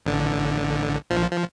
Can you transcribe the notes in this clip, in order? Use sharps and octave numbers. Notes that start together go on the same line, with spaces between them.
A1 D3
A#1 F3
F3